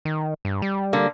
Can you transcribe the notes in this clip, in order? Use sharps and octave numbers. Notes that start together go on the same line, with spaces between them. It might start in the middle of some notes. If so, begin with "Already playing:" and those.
D#3
G2
G3
D3 A#3